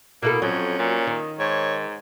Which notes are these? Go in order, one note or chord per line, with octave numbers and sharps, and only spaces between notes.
B2 A#3 E4 A4
F2 F#3 C#4
A#2
D#3
G#2 C#5